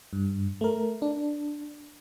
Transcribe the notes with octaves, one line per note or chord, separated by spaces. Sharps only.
G2
A3 A#4
D4